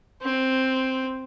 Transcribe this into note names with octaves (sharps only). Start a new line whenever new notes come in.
C4